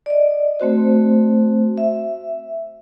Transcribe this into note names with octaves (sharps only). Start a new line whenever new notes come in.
D5 D#5
A3 C4 F#4 C5
E5